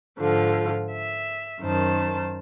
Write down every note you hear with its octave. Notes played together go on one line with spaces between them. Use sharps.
G#2 D3 F3 F4
E5
F#2 D#3 C5 A5